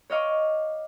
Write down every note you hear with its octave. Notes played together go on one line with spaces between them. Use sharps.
C#5 D#5 F5 C#6 D6